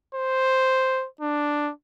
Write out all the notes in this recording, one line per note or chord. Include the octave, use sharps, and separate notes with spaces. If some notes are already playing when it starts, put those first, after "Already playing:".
C5
D4